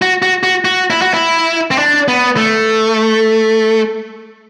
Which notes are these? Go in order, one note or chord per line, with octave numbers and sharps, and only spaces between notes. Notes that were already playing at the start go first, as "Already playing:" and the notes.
F#4
F#4
F#4
F#4
E4
F#4
E4
C4
D4
B3
A3